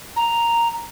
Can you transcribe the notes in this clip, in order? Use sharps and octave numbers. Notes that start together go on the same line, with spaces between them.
A#5